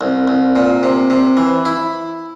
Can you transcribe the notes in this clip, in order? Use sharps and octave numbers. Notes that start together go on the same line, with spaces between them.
C2
C2
A#2
C3
C3
E3
E4